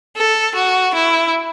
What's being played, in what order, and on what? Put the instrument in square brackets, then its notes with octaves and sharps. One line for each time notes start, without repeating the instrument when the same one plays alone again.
[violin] A4
F#4
E4